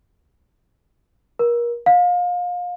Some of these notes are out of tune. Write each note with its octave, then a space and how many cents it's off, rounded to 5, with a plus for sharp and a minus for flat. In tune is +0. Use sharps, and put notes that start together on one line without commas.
A#4 +30
F5 +30